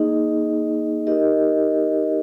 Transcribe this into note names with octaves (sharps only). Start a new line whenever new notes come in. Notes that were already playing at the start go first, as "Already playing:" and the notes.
Already playing: A#3 D#4 G#4 D#5
D#4 G4 A#4 D#5